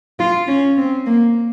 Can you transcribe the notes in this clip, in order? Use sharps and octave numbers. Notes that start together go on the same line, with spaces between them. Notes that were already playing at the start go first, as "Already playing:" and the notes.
F4
C#4
C4
A#3